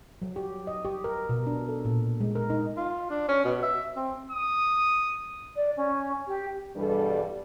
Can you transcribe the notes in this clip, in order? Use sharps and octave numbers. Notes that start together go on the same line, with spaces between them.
F#3
G4
D#5
G4
A#4
B2
D4
A4
A#2
G#3
A#4
D#4
F4
D4
C#4
B2
E5
C4
D#6
D5
C#4
G4
E2 G2 B2 G3 D4 A4